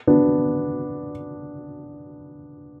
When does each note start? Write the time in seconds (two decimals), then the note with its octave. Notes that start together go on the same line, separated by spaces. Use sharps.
0.07 B3 D4